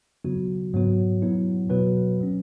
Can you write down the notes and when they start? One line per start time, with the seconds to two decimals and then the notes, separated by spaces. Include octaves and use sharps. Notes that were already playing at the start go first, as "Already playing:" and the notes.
0.24 C#3 F#3 B3 F#4
0.73 G#2 F#3 B3 F#4 C#5
1.22 F#3 B3 E4
1.69 B2 F#3 B3 F#4 B4
2.20 F#3 C#4